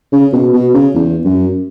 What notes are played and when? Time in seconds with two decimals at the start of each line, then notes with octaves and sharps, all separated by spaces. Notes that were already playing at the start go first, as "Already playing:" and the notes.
0.12 C#3
0.32 B2
0.53 B2
0.74 C#3
0.94 E2
1.25 F#2